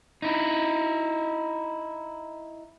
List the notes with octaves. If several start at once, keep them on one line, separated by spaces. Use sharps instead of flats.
D#4 E4